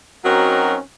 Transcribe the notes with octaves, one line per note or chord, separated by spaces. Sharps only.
F#3 C4 C#4 D#4 F#4 A#4